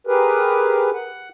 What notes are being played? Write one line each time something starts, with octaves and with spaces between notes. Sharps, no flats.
G4 G#4 A#4 B4
F#5